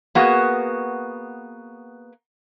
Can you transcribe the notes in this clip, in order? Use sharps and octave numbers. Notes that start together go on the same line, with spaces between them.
A#3 B3 F#4 G#4